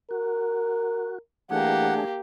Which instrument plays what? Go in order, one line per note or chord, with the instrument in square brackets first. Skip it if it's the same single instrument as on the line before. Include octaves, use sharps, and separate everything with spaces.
[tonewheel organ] F#4 [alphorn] A#4
[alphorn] E3 [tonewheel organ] A3 D4 G#4 [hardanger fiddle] A#3 G4 [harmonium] F#5